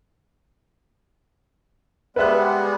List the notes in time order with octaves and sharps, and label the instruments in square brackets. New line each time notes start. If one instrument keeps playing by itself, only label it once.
[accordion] G3 G#3 B3 [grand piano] B4 E5 F#6